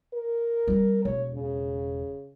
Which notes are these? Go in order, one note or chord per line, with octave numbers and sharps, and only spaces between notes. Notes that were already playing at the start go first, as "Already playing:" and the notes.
A#4
G3 C4
E1 C#5
C#3